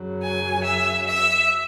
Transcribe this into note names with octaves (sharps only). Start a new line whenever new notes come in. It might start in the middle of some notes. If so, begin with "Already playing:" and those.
Already playing: F#2 C#3 F#3
G#5
E5
E5